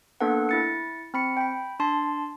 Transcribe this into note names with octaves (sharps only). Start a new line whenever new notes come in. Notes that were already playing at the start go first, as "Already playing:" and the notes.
A#3 B3 D4 A4 B4 F#5
E4 A6 C#7
C4 B5 C#7
G5 B5
D4 A5 C6